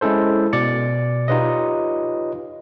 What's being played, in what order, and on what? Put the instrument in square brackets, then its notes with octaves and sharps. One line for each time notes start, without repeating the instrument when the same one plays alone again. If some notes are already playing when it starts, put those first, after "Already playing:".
[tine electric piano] G#3 C#4 E4 A4 C5
B2 D5 C#7
D#4 F4 G4 B4 C#5 D#5